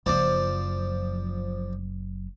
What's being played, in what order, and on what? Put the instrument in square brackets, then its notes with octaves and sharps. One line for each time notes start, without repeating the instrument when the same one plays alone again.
[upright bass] F#1 F#2 [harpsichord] F3 C5 D5